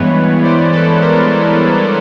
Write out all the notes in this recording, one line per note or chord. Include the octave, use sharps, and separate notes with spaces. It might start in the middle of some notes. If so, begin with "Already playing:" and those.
Already playing: G2 E3 G#3 B3 B4 C#5
C5 D5
A4 B4
A#4 C5